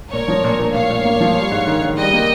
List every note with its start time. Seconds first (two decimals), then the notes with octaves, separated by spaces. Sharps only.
0.13 A#2 A#4 C#5
0.28 F3
0.44 A#2
0.59 A#2
0.74 A#2 C#5 F5
0.90 A#2
1.05 A#3
1.20 F3
1.36 G3
1.51 G#2
1.67 D#3
1.82 D#3
1.97 G3 D#5 G5
2.13 A#3